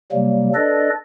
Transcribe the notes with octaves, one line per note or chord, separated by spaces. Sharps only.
C3 F#3 G3 A#3
D4 A4 B4 D5 D#5